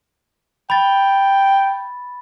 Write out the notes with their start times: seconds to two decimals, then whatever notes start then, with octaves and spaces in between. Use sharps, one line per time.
0.70 G5 B5 A6